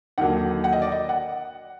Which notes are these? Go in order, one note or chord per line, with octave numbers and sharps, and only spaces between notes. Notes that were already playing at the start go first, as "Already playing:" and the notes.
D#2 D3 F#3 A#3 F#5
F#5
D#5
D5
D#5
F#5